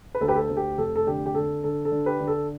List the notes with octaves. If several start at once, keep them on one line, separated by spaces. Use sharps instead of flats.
B4
D2 A4
G4 B4
A4
D2
G4
F1 A4
A4
D3 G4
G4
D3 A4
D3 A4
A4
D3
G4 B4
D3
A4